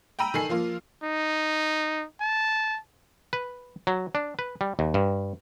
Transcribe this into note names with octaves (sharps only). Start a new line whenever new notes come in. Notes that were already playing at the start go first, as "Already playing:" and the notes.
G5 A#5 B5 E6 D#7
D#3 A4 G#5 C7
F3 A#3 F4
D#4
A5
B4
F#3
D4
B4
G3
D#2
G2